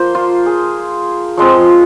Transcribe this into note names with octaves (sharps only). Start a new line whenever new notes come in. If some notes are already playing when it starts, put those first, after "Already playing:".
Already playing: F3 A#3 C5
F4
G#4
F3 G#3 C4 F4